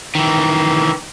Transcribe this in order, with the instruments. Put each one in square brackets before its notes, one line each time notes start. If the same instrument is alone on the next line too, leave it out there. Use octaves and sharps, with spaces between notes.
[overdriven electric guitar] D#3 E3